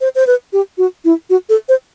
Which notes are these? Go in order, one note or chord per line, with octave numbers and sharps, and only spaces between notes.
C5
C5
B4
G4
F#4
E4
F#4
A4
C5